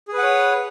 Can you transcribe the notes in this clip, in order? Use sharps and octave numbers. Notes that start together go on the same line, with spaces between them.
G#4 B4 C#5 F#5